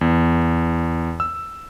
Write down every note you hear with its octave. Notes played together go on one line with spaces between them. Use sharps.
E2
E6